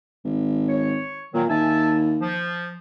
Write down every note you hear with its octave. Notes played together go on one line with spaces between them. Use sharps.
G#1
C#5
A#2 D#3 F#3
D#2 E5 G#5 A5
F3